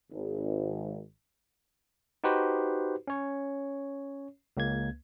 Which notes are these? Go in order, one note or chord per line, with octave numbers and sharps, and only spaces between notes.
G#1
D#4 F#4 G4 B4 C5
C#4 C#5
C#2 A#3 G#6